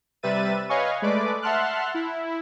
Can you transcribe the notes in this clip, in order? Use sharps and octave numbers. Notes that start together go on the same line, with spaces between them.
C3 G3 B4 E5 A6 D#7
B4 C#5 D#5 F5 G#5 C#6
G#3 A3 B4 D5 D6
E5 F#5 A5 C6 F6 F#6
E4